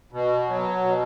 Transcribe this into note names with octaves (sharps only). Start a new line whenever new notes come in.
B2
F#3
B2